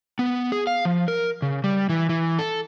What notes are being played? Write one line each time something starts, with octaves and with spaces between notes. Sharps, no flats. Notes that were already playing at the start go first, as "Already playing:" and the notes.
B3
G#4
F5
F3
A#4
C#3
G3
E3
E3
A4